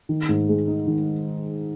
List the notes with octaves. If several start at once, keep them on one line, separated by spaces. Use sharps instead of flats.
D#3
G#2
G#3
D#4
D#3